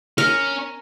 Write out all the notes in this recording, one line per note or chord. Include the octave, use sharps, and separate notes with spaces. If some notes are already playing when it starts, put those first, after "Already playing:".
C#4 A#4